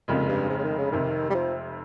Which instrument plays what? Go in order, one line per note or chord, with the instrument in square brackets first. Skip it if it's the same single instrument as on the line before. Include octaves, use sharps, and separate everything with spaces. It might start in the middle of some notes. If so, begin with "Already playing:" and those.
[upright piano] F1 F2 C#3 G#3 [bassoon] A#2
[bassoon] G2
G#2
C#3
D#3
C#3
[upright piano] F1 F2 C3 [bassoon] D#3
[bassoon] G3
F3